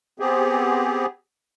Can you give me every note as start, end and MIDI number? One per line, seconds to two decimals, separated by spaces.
0.20 1.06 59
0.20 1.06 60
0.20 1.06 67
0.20 1.06 68